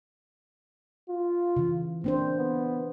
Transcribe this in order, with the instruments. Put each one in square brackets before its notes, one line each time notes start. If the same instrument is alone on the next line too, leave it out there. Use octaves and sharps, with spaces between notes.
[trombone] F4
[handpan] C#3 E3
[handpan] A#3 D4 C5 [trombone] C4
[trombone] B3